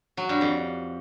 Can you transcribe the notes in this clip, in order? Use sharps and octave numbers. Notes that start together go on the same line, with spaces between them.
F#3
G2
F2